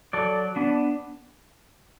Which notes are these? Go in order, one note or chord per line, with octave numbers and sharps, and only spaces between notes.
F#3 A4 D5
B3 D4